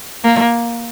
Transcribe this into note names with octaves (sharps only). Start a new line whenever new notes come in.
A#3